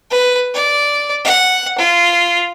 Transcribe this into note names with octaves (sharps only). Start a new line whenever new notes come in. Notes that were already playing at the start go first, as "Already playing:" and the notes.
B4
D5
F#5
F4